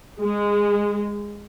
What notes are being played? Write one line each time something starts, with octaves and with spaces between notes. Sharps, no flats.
G#3